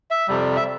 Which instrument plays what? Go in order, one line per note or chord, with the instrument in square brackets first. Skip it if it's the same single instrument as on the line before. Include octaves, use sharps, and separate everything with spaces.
[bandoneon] E5
F2 C3 G3
E5